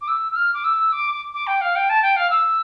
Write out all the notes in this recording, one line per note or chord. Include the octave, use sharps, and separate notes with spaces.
D6
E6
E6
F6
D6
E6
D6
D6
G5
F5
G5
A5
G5
F5
E6